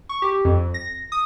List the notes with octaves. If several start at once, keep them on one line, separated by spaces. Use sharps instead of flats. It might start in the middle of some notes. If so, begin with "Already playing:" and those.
C#6
G4
F2
A#6
D#6